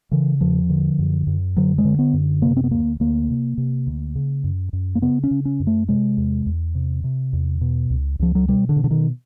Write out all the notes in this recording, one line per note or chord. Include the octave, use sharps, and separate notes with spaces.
C#3 E3
E2 F3
D3
F#2
F#2
D3 F#3
G#3
D3
B3
F#2
C3 A#3
C4
B3
D2 A#3
D2 A#3
C3
C3
D2
C#3
F#2
F#2
A#3
C#3 B3
C#4
C#3
C#4
F#2
A3
C3 G#3
E2
E2
C3
C3
E2
B2
C#2
C#2 F3
F#3
B2 G3
D3
B2
D3
D#3